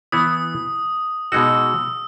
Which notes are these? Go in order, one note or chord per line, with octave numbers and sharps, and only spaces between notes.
E3 B3 E4 D#6
B2 G#3 D#4 F#4 E6